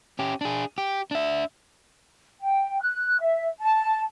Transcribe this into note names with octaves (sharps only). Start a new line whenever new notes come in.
C#4 G4
D4 G#4
G4
D4 E5
G5
F#6
E5
A5